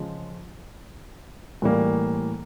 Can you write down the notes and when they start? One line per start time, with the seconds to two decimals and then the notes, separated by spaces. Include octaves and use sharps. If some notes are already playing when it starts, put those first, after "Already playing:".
Already playing: C#3 F3 G#3
1.62 A2 E3 G3 A#3